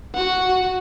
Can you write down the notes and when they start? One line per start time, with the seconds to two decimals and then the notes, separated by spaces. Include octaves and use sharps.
0.15 F#4 F#5